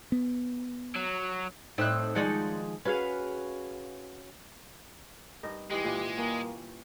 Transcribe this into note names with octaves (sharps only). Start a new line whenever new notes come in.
B3
F#3
A2 C4 D#4 E5 E6 F#6
D#3 F3 G#3 D#4 D5 F#5
C#4 F#4 G#4 B4 F5
G2 D#4 A#4
E3 G#3 G4 D#5
A#2 E3 F#5
G3 A#3 C#4